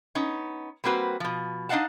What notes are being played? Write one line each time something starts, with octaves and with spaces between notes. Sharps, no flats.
B3 C#4 D#4
G3 A#3 C4 F#4 B4
B2 F3
D4 D#4 D#5 F5 F#5 A5